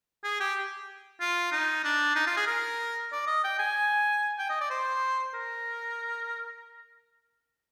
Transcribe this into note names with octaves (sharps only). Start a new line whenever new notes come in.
G#4
G4
F4
D#4
D4
D#4
F4
G#4
A#4
D5
D#5
G5
G#5
G5
D#5
D5
C5
A#4